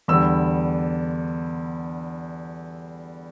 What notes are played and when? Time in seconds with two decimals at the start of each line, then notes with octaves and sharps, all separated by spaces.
0.08 E2 D3 G3 E6